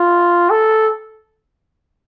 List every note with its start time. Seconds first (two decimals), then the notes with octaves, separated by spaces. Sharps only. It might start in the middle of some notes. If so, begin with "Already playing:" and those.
Already playing: F4
0.50 A4